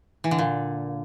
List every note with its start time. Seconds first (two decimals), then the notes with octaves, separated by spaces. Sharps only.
0.24 E3
0.31 D3
0.38 A#2